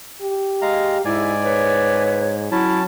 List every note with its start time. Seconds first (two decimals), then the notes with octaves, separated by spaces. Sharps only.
0.21 G4
0.62 G#3 F5 A#5
1.05 G#2 E4 D5 G#5
1.43 B4 C#5
2.51 F#3 C#4 E4 A5